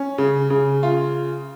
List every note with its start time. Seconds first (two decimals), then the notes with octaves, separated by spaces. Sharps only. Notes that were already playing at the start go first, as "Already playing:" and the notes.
Already playing: C#4
0.18 C#3
0.50 C#3
0.83 F4